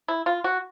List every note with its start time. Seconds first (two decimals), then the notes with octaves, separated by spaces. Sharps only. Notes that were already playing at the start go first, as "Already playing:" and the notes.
0.08 E4
0.26 F4
0.44 F#4